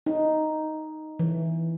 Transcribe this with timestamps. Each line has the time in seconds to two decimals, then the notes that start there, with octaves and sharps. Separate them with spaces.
0.06 D#4
1.19 E3